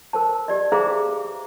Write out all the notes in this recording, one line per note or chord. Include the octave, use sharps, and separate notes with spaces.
A#4 C5 A5
G4 D5 D#5
G#4 C5 E5 F5 A#5 D6